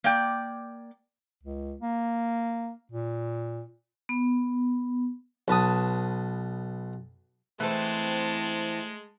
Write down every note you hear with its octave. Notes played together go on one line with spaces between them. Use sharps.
A#3 D5 G5
C#2
A#3
A#2
B3
B1 B4 A5 D#6
E3 G#3 A3 C4 A5